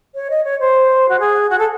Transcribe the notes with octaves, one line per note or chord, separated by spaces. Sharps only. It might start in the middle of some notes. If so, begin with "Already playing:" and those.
C#5
D#5
C#5
C5
F#4
G#4
F#4
A4